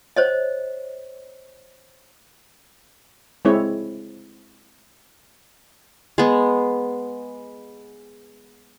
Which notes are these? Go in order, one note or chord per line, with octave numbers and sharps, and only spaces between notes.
C5 C#5 D#5
G#3 C4 E4 C#5
G#3 B3